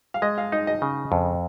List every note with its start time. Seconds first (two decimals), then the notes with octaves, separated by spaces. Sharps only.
0.14 F5
0.22 G#3 D#5
0.38 F5
0.52 D#4 D#5
0.67 D#5
0.82 C#3
1.12 F2